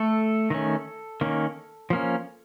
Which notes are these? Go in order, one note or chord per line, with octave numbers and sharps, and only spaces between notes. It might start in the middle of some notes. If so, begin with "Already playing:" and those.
Already playing: A3 A4
D#3 A3 C#4
D#3 A#3 C#4
F3 A#3 C#4